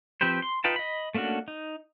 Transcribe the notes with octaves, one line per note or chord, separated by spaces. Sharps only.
F3 C4 G4 B4 C5
C6
D#4 F4 B4 G5 A5
D#5 B5
A3 A#3 C#4 D4 F#4
D#4